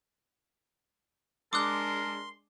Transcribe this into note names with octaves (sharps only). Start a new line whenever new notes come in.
G#3 D4 A#4 C6 D6 D#6 F#6